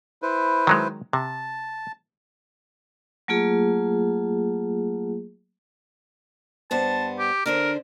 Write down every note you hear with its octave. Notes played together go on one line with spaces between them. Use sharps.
E4 B4 C5
D#3 F#3 G#3
C3 A5
F#3 A3 A#3 F4 G#4
G2 B3 C5 A5
G4
D3 D4 A#4 C5